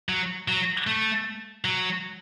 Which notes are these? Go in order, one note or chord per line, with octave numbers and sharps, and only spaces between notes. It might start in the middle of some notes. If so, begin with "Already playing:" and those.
F#3
F#3
A3
F#3